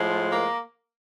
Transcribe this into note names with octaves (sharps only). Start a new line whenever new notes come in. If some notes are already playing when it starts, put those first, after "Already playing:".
Already playing: A2 F3 G#3
A#3 A#4